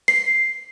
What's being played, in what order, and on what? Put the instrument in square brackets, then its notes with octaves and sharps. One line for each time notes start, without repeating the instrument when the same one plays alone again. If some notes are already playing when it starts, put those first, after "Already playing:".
[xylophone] C7